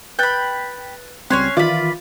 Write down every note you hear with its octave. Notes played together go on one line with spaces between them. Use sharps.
B4 G5 B5 F#6 A6
C#2 G3 C4 C#4 C#5 C6 F#6 G#6
D#3 E3 F4 D5 E5 B5